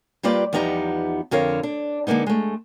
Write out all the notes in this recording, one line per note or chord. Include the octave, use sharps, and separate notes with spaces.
G3 A#3 F4 G4 B4 D5
E2 F3 B3 D#4 G4 A#5
F2 D3 A#4 C#5 F5
D4
D3 G#3 A#3 B3 D#4
G#3 A3